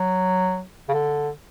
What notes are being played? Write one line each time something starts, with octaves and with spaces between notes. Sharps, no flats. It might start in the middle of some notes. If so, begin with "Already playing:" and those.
Already playing: F#3
C#3
D3